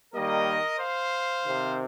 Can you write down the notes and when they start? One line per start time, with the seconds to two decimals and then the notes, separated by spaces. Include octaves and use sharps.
0.14 D#3 G3 A#3 A#4 D#5
0.78 C5 F5
1.44 C3 D#3 C4